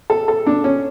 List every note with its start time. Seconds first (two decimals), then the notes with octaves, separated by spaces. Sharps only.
0.10 A4
0.28 A4
0.46 D4
0.64 C#4